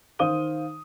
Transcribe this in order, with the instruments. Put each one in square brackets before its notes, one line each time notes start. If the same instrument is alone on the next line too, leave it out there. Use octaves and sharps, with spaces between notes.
[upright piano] D#3 C5 F5 D#6 D#7 G7